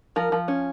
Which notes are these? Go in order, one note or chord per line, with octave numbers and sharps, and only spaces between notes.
F3 A#4
F3
C#4